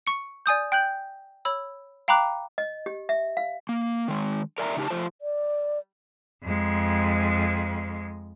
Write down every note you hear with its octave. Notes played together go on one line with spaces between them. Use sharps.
C#6 C#7
D5 G#5 D#6 G6
G5 F#6 G6 F#7
C#5 B5 E6
F5 G5 A#5 B5 D6 F#6
D#5
G4
E5
F5
A#3
D#3 G#3
A#4 D5 E5 G#5 A#5
C#3 D#4 G4 A5
F3 A3 F4 C5
D5
F2 G#3